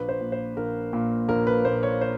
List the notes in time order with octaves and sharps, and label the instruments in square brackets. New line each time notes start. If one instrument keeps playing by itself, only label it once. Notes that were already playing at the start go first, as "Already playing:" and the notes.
Already playing: [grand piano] A#1 B4
C5
A#2
C5
A#1 A#4
A#2
A#1 A#4
B4
A#2 C5
C#5
C5